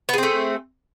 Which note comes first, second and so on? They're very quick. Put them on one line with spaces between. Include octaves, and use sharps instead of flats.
B3 G#4 C4 A3